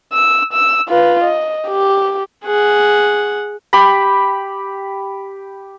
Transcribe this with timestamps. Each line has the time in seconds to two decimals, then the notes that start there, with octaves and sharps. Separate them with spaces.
0.14 E6
0.53 E6
0.89 F4 B4
1.25 D#5
1.68 G4
2.44 G#4 F#5
3.73 G4 B5